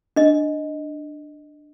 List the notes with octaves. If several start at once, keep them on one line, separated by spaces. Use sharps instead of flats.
D4 D#5